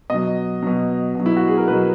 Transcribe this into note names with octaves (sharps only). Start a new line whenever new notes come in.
B2 F#3 D#5
B2 F#3
B2 F#3
E4
F#4
G#4
A#4
B2 F#3 B4